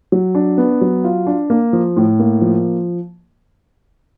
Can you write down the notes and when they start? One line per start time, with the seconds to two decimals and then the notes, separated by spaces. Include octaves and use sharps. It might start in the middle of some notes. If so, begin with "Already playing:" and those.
0.12 F#3
0.35 D4
0.58 B3
0.81 F#3
1.04 F4
1.27 D4
1.50 A#3
1.73 F3
1.96 A2
2.20 A#3
2.42 F3